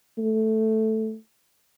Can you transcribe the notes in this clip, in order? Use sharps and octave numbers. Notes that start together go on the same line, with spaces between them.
A3